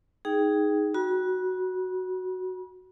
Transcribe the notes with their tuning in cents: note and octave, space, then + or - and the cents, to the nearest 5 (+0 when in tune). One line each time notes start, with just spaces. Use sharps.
D#4 +5 G#4 +0 G5 +0
F#4 +0 B5 -35